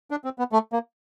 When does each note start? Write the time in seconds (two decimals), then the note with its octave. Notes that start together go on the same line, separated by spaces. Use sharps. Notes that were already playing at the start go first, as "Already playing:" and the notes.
0.11 D4
0.24 C4
0.39 B3
0.52 A3
0.72 A#3